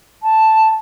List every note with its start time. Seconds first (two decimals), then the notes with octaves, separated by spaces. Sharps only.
0.22 A5